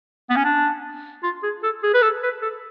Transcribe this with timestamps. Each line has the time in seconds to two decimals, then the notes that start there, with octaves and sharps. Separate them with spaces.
0.30 B3
0.36 C#4
0.44 D4
1.23 F4
1.43 G#4
1.63 A4
1.83 G#4
1.94 B4
2.02 A4
2.23 B4
2.42 A4